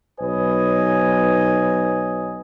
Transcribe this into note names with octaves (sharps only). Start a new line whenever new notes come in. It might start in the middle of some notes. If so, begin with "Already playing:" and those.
B1 B4 C#5 D#5 G#5